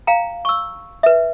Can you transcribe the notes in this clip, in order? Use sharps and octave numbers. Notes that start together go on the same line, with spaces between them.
F5 G5 A#5
C#6 E6
B4 E5